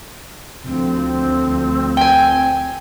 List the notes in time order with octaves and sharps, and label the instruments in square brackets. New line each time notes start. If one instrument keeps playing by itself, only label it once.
[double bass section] D2 F3 [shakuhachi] C4
[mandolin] G5 G#5